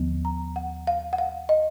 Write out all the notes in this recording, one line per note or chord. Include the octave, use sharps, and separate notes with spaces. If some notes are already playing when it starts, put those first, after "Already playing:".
Already playing: D#2 D3 F3 B3
A#5
F#5
F5
F#5
F5
D#5